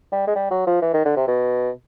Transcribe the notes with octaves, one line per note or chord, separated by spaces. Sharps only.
G3
G#3
G3
F#3
F3
E3
D#3
D3
C3
B2